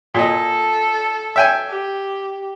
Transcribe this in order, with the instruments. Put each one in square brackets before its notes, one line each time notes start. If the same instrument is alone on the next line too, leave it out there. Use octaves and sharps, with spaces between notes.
[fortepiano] A#2 D#5 [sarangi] A4
[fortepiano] E5 G5 G#5
[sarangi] G4